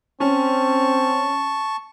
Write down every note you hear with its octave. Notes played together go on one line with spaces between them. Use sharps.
C4 C#4 A5 C#6